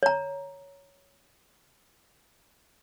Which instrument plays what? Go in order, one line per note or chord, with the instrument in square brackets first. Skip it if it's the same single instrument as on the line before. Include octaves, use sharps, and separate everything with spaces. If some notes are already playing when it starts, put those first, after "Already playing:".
[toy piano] C#5 A#5